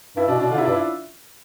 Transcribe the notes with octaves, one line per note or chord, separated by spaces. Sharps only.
G2 E4
B2 D4
B2 D4
D3 F4
C3 E4
G2 D4
E4